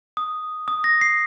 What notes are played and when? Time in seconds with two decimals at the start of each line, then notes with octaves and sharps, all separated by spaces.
0.17 D#6
0.68 D#6
0.84 A#6
1.01 C7